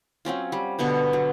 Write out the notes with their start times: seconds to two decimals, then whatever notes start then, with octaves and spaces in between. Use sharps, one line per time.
0.25 F#3 C4 C#4 F4
0.52 G3
0.79 B2 D3 B3 C#5
1.13 F#3